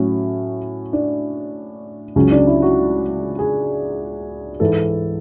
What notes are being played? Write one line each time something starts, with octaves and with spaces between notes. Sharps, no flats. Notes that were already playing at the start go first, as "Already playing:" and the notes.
Already playing: A2 F#3 C#4
D4
C#2 C#3 F#3 C#4
D4
E4
F#4
G#4
G#2 E3 G#3 A4